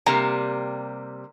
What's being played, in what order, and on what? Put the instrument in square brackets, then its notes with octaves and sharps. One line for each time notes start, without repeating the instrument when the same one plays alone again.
[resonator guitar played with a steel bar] C3 G3 A#3 [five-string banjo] A#5